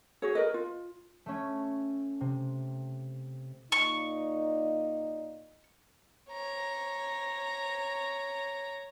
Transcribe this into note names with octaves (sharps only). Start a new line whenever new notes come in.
F#4 G#4 C#5
A#4 B4 D#5
F4
A3 C#4
C3
A#2 D#4 C#6
C#5 A#5